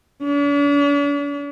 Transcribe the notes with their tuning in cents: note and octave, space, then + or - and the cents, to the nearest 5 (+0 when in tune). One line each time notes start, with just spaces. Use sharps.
D4 -45